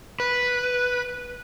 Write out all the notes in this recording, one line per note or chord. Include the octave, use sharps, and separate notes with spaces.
B4